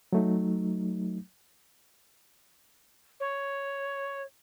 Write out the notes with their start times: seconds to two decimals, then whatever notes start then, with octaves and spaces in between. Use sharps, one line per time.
0.13 F#3 A3 D#4
3.20 C#5